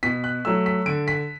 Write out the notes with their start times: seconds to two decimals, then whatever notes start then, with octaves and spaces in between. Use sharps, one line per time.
0.03 B2 B6
0.24 F#6
0.45 F#3 A3 E6
0.66 B6
0.86 D3 D7
1.08 B6